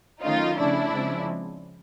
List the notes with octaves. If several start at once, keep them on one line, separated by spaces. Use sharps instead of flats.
D#3 F#3 A3 C#4 D#4 F4
C#3 F3 A3 C#4 D4 E4
C#3 F3 G#3 C4